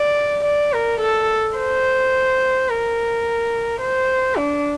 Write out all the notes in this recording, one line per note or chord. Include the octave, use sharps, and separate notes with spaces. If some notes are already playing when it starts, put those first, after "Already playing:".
Already playing: D5
D5
A#4
A4
C5
A#4
C5
D4